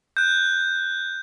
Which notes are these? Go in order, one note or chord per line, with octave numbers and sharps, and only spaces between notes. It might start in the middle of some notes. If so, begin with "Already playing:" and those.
F#6 G6